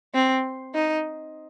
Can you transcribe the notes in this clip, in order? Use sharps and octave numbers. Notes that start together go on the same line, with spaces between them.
C4
D#4